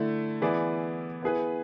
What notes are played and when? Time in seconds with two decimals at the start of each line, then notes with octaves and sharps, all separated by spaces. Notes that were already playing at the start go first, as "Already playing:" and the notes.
Already playing: D3 A3 E4
0.42 E3 B3 E4 G#4 D5
1.23 B3 E4 G#4 B4